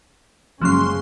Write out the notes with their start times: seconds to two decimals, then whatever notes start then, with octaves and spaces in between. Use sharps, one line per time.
0.61 F#1 F3 F#3 G#3 C#4 C6